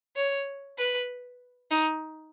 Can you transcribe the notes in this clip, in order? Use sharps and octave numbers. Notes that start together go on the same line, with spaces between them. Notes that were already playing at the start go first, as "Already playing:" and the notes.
C#5
B4
D#4